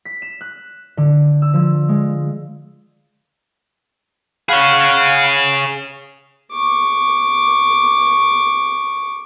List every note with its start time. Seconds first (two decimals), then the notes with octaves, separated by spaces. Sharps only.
0.05 B6
0.22 E7
0.41 F#6
0.97 D3
1.42 E6
1.53 F3
1.89 G#3
4.49 G#4 C#5 F5 F#5 B5
6.52 C#6 D6